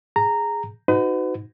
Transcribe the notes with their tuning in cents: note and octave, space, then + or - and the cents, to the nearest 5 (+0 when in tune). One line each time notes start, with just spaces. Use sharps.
G#4 +0 A#5 -10
D#4 +0 F#4 +0 B4 +40